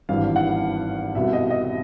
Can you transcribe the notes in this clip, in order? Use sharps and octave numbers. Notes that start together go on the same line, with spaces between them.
G#1 G2 E3 F5
F#5
C2 B2 E5
D#5
D#5